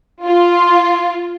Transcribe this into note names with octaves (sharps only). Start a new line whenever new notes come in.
F4